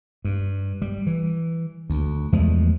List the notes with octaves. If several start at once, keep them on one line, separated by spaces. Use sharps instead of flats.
G2
G3
E3
D2
E2 F3 G#3 A3